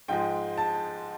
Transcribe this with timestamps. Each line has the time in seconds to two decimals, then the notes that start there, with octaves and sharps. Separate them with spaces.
0.08 G#2 F3 G#3 G5
0.58 A5